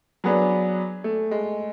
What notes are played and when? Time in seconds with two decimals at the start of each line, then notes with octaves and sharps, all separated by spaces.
0.24 F#3 B3 D4 G#4
1.04 A3
1.31 G#3